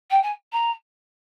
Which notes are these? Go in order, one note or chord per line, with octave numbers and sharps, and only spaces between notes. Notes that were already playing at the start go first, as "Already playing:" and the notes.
G5
G#5
A#5